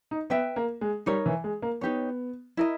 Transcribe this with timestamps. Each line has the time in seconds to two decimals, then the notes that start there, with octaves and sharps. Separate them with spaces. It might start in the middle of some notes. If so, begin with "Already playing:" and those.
0.11 D#4
0.30 B3 B4 E5 G5
0.56 A#3
0.81 G#3
1.06 G3 D#4 A#4 C#5
1.26 E3
1.44 G#3
1.62 A#3
1.81 B3 D#4 G4 C#5
2.57 E4 A#4 D#5